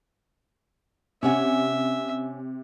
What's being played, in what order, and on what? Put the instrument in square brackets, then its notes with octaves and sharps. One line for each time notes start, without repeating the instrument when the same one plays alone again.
[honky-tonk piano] C3 [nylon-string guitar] C#4 F#5 G#5 [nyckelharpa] E5